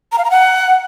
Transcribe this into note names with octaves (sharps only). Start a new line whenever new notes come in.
A#5
F5
A#5
F#5